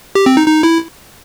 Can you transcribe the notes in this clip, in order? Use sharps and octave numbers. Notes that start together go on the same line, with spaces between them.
G4
C4
D#4
D#4
E4